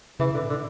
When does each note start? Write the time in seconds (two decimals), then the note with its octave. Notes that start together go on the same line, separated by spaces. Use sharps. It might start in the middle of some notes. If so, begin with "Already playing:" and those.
0.20 C#3 E3
0.34 B2 D3
0.43 A2
0.50 D3